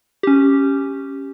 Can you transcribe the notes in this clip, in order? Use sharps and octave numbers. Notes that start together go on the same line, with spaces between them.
C#4 G4